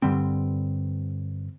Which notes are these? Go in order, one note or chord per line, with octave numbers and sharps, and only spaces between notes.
G2 D3 G3 C4